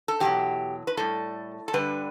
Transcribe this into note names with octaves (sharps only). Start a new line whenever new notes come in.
A4
E2 B2 F#3 G4
B4
A2 G3 A4
A4
G2 D3 G3 B4